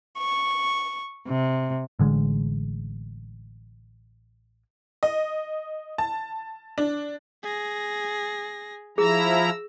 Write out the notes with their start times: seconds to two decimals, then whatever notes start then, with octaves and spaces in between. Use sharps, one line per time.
0.19 C#6
1.26 C3
1.99 A1 D3 G#3
5.03 D#5
5.98 A5
6.78 D4
7.43 G#4 A#6
8.98 F3 E4 G#4 A#5 E6 A#6